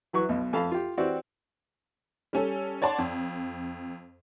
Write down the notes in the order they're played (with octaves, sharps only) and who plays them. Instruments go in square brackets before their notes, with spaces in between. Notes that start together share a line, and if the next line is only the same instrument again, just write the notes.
[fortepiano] E3 F#3 B4 C#6
B1 B2
F2 A4 F5 A5 B5
F4 G4
E3 C4 F#4 G4 D5
[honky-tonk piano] G3 C#4 A4
C#5 D5 F#5 A5 C6
F2